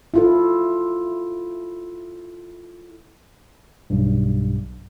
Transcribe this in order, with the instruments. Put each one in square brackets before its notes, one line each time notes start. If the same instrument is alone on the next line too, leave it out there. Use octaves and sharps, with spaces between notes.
[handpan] E4 F4 A4
[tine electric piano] B1 G2